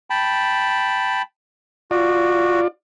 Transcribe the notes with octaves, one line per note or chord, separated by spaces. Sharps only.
G5 A5 B5
F4 F#4 D5